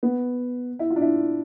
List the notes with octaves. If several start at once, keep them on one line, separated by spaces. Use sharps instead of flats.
B3
E4
F4
D4
E4